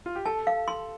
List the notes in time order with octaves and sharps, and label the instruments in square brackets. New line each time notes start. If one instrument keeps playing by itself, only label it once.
[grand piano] F4
G4
[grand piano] A4 [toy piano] A5
[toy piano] F5
C6